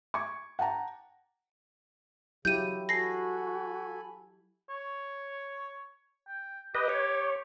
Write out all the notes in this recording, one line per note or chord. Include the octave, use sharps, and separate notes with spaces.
C#6 D6 G#6
F#5 G5 A5 A#5
C#3 F#3 E4 G4 G6 D#7
F#4 A4 G#5 B5 A#6 C7
C#5
G5
G4 B4 D#5
C#5